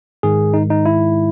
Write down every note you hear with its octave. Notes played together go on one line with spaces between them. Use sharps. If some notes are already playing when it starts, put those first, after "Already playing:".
G#2 D#3 G#3 G#4
D#4
D#4
E4